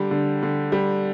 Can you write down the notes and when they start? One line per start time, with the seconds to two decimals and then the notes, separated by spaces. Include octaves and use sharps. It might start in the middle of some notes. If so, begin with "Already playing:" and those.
Already playing: D3 G3 G4
0.11 D3
0.43 D3
0.72 G3